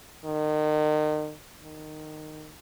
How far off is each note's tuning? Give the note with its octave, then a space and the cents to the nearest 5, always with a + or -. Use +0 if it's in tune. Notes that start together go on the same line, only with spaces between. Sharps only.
D#3 -35
D#3 -15